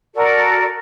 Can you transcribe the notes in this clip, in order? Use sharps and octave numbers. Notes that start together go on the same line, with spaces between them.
F#4 A4 A#4 D5